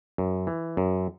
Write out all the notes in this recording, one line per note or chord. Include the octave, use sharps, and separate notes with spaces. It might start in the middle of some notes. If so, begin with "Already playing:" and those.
F#2
E3
F#2